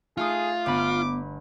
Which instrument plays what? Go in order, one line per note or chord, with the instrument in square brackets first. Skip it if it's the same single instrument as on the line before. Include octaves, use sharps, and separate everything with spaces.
[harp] A3 D#4 D#6 [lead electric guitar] F4 [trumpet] G#4
[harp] G1 B5 [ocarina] B3 [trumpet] D6